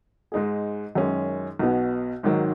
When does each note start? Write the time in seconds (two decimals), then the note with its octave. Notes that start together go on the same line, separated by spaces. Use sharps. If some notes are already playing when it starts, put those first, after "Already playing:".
0.32 G#2 G#3 D#4 G#4
0.95 F#2 D#3 G#3 C#4
1.59 B1 B2 B3
2.23 G#1 G#2 D#3 F#3